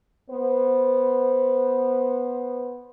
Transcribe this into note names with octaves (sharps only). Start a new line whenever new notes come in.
B3 C5